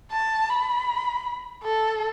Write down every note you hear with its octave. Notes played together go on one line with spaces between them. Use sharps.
A5
B5
A4